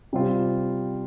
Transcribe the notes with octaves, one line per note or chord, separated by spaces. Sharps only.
C3 G3 C4 F4